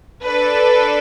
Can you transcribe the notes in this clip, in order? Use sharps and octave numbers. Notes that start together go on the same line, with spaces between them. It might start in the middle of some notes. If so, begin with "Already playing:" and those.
D4 A4 B4